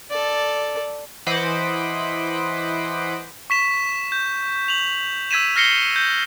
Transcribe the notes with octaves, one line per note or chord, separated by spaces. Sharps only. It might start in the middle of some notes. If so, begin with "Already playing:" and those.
A4 D5
E3 C5 D#5 F#5 B5 D6
C#6 B6 E7
G6
F7 F#7
E6 G#6 B6 D#7 E7
F6 A#6 C7 C#7 G7
G6